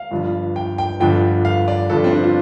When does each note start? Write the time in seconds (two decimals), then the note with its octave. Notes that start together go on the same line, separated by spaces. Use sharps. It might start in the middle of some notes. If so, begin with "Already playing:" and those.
Already playing: F5
0.11 G1 G2 F3
0.56 G5
0.78 G5
1.00 G1 G2 D3 F3 G5
1.45 F5
1.68 D5
1.90 G1 G2 F3 A4
2.04 C4
2.12 D4
2.23 F4